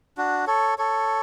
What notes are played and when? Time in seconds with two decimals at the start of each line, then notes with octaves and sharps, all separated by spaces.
0.18 D4 F#4
0.47 A4 C#5
0.78 A4 C#5